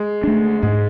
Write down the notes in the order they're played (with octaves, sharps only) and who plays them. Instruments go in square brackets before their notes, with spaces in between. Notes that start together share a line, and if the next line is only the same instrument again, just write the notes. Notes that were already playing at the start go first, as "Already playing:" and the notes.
Already playing: [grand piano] G#3
[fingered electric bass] A3 D4
[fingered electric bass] G#2 [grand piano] G#3